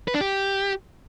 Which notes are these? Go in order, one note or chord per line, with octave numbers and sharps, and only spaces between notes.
B4
D4
G4